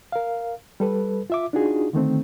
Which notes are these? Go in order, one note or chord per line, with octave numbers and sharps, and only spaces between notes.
A#4 F5
G3 A4 B4
F4 E5 D6
D4 D#4 F4 F#4 G#4
D3 D#3 A3 C4